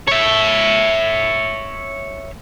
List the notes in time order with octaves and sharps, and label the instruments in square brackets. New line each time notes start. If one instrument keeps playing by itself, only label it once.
[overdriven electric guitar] C#5 E5